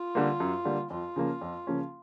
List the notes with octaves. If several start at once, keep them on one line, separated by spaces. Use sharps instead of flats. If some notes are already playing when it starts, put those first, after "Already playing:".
Already playing: F4
D3 G3 A#3
F#2
D3 G3 A#3
F2 F4
C#3 F3 A#3 C#4
F2
C#3 F3 A#3 C#4